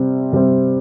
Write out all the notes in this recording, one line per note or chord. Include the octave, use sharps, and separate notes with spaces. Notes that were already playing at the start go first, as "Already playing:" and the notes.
Already playing: C3 G3 C4
C3 G3 C4